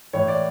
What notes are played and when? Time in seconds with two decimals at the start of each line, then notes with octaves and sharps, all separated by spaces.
0.13 A2 E3 C#5
0.28 D5